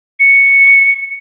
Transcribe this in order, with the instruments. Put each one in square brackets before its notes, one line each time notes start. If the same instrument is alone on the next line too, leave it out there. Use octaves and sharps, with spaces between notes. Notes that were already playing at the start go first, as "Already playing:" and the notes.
[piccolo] C#7